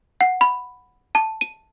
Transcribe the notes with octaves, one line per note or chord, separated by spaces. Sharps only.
F#5
B5
A5
D#7